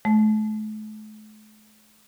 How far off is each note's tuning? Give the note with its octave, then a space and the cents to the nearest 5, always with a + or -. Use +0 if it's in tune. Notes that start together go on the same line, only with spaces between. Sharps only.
A3 -40